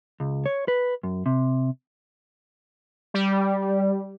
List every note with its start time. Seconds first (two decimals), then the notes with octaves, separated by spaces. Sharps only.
0.20 C#2
0.46 C#5
0.68 B4
1.03 F#2
1.26 C3
3.14 G3